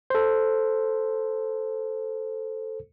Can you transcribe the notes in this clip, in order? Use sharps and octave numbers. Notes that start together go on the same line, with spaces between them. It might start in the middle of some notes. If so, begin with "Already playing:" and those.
A4 C5